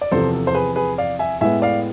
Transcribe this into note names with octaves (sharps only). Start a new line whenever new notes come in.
D5
E2 C3 F3 A4 C5
A4
C5
G#4 B4
G#4 B4
D5 F5
E5 G#5
A2 G#3 B3 E5 G#5
D5 F5